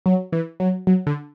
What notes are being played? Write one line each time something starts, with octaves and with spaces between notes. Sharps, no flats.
F#3
E3
F#3
F#3
D3